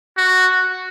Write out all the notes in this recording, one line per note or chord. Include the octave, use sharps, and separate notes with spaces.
F#4